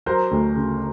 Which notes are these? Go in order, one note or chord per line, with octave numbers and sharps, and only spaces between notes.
F#3 A#4 C5
D2
C#3